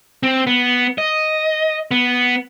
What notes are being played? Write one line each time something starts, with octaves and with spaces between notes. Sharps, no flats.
C4
B3
D#5
B3